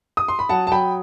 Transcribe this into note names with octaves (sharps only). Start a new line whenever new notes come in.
D#6
C6
B5
F#3 F#5 A5
A5
F#3 G5 B5